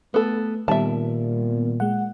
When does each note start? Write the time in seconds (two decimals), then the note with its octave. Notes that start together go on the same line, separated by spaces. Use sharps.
0.14 A3 B3 A4
0.68 A#2 D#3 G3 B3 E5 A5
1.80 G#3 F#5